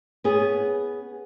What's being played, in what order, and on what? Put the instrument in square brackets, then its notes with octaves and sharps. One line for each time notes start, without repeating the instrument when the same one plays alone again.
[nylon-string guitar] B3 C#4 G#4